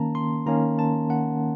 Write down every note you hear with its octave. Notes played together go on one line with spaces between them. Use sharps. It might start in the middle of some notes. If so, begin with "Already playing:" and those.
Already playing: D#3 A#3 C#4 A5 A#5
C6
D#3 A#3 C#4 A#5
A5
F#5